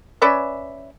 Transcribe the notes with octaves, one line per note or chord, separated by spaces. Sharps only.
C#4 B4 D5 E5